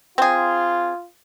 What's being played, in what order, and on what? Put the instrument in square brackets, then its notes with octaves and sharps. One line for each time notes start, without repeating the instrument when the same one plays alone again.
[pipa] C4 G#4 [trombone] F4